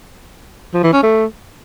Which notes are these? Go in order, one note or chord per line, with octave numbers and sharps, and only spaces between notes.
F3
E3
C#4
A3